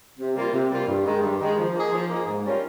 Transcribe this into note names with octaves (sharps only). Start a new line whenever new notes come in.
C3
G3 A#3 F4
C3
G3 A#3 F4
G2
D#3 G#3
G2
D#3 G#3
F3
A#3 D#4 G#4
F3
A#3 D#4 G#4
G#2
G3 C#4 F4 A#4